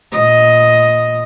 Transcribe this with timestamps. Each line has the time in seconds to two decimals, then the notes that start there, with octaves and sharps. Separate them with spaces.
0.13 A#2 D#5